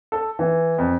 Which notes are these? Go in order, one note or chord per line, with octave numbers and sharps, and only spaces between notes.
A4
E3
F2